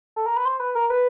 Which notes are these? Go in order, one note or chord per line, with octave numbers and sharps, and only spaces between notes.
A4
A#4
B4
C5
B4
A#4
B4